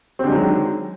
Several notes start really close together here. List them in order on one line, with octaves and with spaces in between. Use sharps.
C4 D3 G#3 F#3 D#3